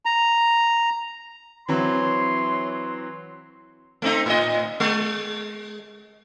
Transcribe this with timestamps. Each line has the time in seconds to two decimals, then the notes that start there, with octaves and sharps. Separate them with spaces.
0.05 A#5
1.68 E3 F#3 C4 C#5 C6
4.02 A3 C4 D#4
4.26 A2 D#5
4.80 G#3